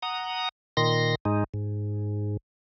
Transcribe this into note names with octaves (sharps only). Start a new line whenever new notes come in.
F#5 A#5 D#6
A#2 D#3 C6 A#6
G#2 G#3 D#4
G#2